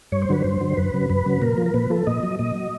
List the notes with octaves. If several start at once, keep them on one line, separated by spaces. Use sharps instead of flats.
G2 C#5
C5
D3 F#3 B4
G2 C5
D3 F#3
F#2 B4
C#3 F#3
F#2 B4
C#3 F#3
A#2 A#4
F3
A#4
A#2 B4
F3 A4
A#2 D#5
F#3
A#2 D#5
F#3